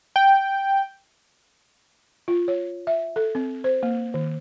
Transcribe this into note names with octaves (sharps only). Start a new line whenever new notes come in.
G5
F4
C#5
E5
A4
C4
C5
A#3
D#3